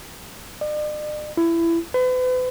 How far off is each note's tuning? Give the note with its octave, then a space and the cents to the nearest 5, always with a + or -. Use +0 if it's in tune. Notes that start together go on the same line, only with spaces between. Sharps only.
D5 +45
E4 +20
B4 +40